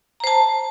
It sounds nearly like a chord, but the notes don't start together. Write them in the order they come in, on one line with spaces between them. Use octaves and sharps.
A#5 C5 A5